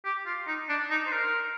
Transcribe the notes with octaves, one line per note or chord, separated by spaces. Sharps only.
G4
F4
D#4
D4
D#4
C5
A#4